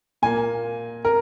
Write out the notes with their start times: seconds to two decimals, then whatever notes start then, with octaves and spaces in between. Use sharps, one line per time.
0.22 A#2 A#3 G#5
1.05 A#4